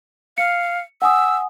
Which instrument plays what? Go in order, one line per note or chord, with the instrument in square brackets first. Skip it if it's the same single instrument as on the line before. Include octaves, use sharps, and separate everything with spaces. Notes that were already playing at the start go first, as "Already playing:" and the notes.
[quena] F5 [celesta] C#7
[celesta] F#5 G#5 D#6 [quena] E6